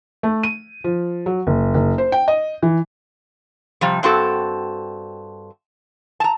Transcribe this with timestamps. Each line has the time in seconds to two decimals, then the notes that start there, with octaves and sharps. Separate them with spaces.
0.23 A3
0.43 D#7
0.84 F3
1.26 F#3
1.47 F#1
1.74 F#1
1.98 C5
2.12 G5
2.28 D#5
2.62 E3
3.81 C3 F3 G3
4.03 G2 C4 F#4 A4
6.20 A5 A#5